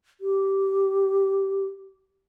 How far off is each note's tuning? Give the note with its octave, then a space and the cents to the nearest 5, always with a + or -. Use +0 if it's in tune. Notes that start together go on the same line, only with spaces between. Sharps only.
G4 -10